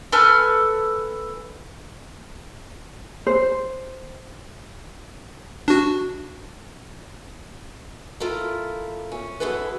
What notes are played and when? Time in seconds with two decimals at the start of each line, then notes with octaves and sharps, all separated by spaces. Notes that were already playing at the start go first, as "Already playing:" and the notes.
0.12 A4 B4 G#5 F6
3.27 C5
5.68 D4 F#4
8.20 E4 F4 A4 A#4
9.12 C#4
9.40 F#2 E4 G#4 A4 B4